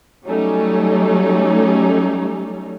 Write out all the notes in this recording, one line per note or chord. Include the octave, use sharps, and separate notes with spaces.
F#3 G3 A3 C#4 D#4